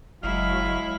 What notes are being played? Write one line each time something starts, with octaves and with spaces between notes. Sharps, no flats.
F#1 F#3 G#3 E4 F5